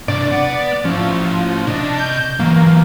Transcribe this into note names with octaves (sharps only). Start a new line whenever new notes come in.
C3 D4 D5
B3 F#5
F3 C#4 E4
C3 D4 D#5
G6
E3 F#3 A#3